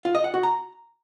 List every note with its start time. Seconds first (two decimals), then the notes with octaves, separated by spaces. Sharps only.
0.05 F4
0.15 D#5
0.24 F#5
0.34 F#4
0.43 A#5